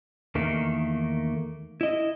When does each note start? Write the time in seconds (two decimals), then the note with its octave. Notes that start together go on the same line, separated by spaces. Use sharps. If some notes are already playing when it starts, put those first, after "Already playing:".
0.35 E2 D#3 A3 A#3
1.81 E4 D#5